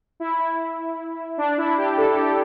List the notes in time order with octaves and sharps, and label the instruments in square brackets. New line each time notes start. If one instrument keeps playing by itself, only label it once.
[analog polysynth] E4
E4
D4
E4
G4
A4
G4